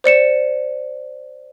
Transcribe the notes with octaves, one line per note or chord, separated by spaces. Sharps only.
C5 D5 C#7 E7